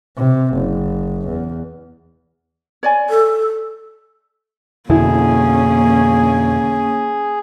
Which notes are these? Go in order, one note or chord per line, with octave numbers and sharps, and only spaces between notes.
C3
F#1
E2
C#5 D5 G#5
A4
F2 B2 D3 A#3 C#4 E4 G#4